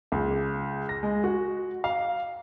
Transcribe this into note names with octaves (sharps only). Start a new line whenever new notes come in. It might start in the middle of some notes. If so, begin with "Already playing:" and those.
C#2
A#6
G#3
F#4
F5